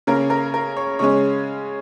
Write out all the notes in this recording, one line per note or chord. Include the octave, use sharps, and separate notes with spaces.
C#3 A#3 C#4 A#4
A#4
A#4
C#5
C#3 G#3 C#4 C#5